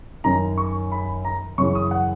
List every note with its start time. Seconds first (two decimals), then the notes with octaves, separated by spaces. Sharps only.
0.24 F#2 D#3 A#5
0.58 C#6
0.92 B5
1.25 A#5
1.58 F#2 C#3 E3 C#6
1.75 D#6
1.91 F#5